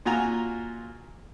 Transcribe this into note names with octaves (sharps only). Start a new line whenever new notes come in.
A#2 F4 F#4 G#5 A#5